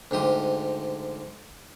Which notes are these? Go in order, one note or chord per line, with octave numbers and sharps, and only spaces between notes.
D2 G#2 G4 D#6